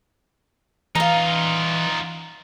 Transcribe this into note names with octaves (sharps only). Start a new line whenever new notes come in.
E3 D#4 F4 F5 A#5